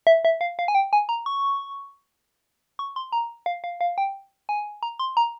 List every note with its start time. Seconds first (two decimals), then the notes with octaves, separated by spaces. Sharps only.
0.07 E5
0.25 E5
0.41 F5
0.59 F5
0.68 G#5
0.75 G5
0.93 G#5
1.09 A#5
1.26 C#6
2.79 C#6
2.96 C6
3.12 A#5
3.46 F5
3.64 F5
3.81 F5
3.98 G5
4.49 G#5
4.83 A#5
4.99 C6
5.17 A#5